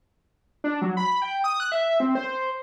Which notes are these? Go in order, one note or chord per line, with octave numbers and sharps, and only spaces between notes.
D4
F#3
B5
G5
D#6
F#6
E5
C4
C5